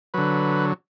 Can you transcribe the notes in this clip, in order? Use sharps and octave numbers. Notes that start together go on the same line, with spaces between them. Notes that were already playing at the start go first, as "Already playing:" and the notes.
D3 F#3 B4